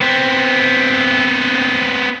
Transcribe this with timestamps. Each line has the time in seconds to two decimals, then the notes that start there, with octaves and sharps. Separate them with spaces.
0.01 B3 C4